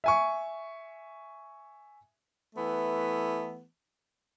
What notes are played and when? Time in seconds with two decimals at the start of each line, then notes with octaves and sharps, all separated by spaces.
0.04 E5 G#5 C#6
2.56 E3 A3 B3